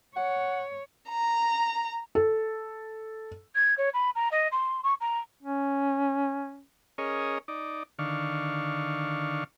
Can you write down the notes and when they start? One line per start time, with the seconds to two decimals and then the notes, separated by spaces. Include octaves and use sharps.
0.17 C#5 F#5
1.09 A#5
2.15 A4
3.55 G#6
3.77 C#5
3.93 B5
4.15 A#5
4.31 D#5
4.51 C6
4.83 C#6
5.00 A#5
5.43 C#4
6.98 C#4 G#4 A#4 C#5 D#5
7.48 D#4 D5
7.99 D3 D#3 D4 F5 C#6